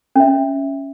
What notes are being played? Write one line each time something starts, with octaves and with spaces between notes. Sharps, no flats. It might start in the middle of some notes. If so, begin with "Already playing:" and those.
C#4 E5